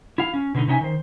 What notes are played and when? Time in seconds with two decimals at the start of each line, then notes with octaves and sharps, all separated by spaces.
0.18 E4 F5
0.34 C#4
0.54 B2 D3 A3 D#4
0.67 C3 C#4 D#4 E5 G#5
0.81 D#3 C5